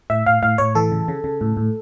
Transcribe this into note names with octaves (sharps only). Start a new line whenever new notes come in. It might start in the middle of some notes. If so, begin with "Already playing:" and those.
A2 E5
A2 F5
A2 F5
A2 C#5
E3 A4
C#3
C#3
C#3
A2
A2